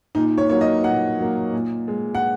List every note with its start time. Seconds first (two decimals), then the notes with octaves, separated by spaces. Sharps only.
0.15 A#2 D#4
0.38 C#5
0.49 F#3 A#3 C#5
0.61 D#5
0.84 A#2 F#5
1.19 F#3 A#3
1.53 A#2
1.88 G#3
2.15 F#5